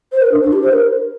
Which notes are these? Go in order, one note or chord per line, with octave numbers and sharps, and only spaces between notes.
C5
A#4
D4
D4
G4
C5
A#4